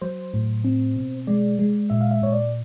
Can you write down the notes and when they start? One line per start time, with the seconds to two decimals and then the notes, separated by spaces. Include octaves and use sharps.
0.02 F#3 C5
0.34 A2
0.64 C4
0.96 B2
1.27 G#3 D5
1.59 G#3
1.90 A#2 E5
2.01 F5
2.11 E5
2.22 A#2 C#5
2.33 D5